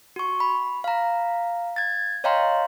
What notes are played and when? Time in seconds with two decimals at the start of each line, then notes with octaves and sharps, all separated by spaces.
0.16 F#4 C#6
0.40 B5
0.84 F5 A#5
1.76 G#6 A6
2.24 C#5 D#5 F5 G5 A#5 C6